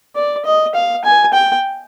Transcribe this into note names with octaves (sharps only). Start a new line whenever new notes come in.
D5
D#5
F5
G#5
G5